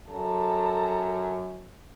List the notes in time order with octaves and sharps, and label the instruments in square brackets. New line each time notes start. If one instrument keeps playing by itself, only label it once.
[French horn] F#2 [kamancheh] A4 A#5